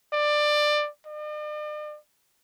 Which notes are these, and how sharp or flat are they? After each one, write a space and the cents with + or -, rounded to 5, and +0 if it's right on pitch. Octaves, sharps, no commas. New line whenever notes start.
D5 +20
D5 +45